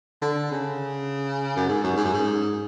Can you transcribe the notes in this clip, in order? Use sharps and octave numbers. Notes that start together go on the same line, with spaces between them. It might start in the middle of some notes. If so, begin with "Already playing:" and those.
D3
C#3
F#2
G#2
F#2
G#2
F#2
G#2